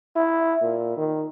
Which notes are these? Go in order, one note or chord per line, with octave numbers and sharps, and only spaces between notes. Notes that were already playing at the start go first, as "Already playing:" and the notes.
E4
A#2
D#3